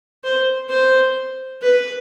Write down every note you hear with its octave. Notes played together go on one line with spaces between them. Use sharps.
C5
C5
B4